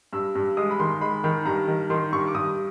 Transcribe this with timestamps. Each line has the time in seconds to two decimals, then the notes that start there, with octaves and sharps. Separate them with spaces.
0.13 G2 E6
0.35 G2
0.57 G#3 D#6
0.71 B5
0.80 D#3 C6
1.01 G#3 B5
1.24 D#3 B5
1.45 G2 A#5
1.68 D#3
1.90 D#3 C6
2.12 G2 C#6
2.28 D6
2.35 G2 D#6